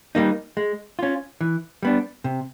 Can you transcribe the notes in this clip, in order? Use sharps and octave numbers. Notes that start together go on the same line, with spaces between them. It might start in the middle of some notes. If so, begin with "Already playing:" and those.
G3 A#3 D#4
G#3
C#4 F4
E3
G3 B3 D4
C3